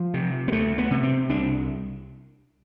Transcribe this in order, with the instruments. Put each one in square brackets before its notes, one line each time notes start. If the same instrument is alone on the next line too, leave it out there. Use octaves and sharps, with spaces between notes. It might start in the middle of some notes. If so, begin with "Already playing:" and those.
Already playing: [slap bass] F3
C3
B3
D2 A3
B3
C3
C4
C2 D4